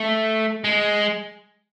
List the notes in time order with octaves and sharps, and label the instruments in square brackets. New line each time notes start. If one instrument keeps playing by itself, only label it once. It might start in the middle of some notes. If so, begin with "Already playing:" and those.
Already playing: [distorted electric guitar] A3
G#3